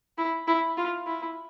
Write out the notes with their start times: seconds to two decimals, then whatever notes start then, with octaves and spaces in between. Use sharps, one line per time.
0.18 E4
0.47 E4
0.78 F4
1.06 E4